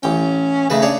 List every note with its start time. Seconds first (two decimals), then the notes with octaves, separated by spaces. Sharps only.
0.03 A1 C#4 G5
0.70 C#3 A3 D#4 B4
0.82 D4 G#4 C#5